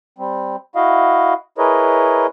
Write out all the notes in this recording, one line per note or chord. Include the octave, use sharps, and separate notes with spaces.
G3 C4
E4 F#4 D#5 F5
E4 G#4 A#4 B4 C#5 D#5